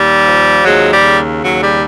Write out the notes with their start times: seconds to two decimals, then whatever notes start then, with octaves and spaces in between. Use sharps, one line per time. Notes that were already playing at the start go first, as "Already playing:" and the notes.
Already playing: D#2 G3
0.26 F3
0.65 D#2 F#3 G#3
0.91 G3
1.04 C#3
1.42 D#2 F#3
1.61 G3